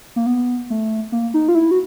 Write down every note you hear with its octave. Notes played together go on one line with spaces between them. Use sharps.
A#3
B3
A3
A#3
D#4
F4
E4
F#4